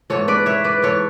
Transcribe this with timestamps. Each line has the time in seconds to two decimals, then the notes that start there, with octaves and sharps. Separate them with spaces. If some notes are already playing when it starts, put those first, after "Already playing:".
0.10 G#2 E3 A4 C#5
0.28 B4 D5
0.46 C#5 E5
0.64 B4 D5
0.82 G#2 E3 A4 C#5